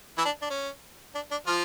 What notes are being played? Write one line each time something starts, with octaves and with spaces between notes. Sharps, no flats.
E3 E4
D4
D4
C#4
D4
D4
F3 F4